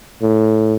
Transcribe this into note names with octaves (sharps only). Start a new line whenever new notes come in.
A2